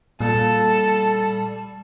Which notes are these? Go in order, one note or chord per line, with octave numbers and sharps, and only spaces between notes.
A#2 G3 A4